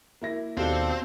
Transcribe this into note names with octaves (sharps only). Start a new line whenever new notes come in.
A#3 E4 A#6
D#2 B2 C4 D4 G4 A4 F5